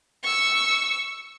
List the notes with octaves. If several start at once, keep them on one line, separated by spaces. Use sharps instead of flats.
C#6 E6